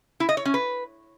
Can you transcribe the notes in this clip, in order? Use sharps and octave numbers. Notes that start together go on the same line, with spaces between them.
E4
D#5
C#5
C#4
B4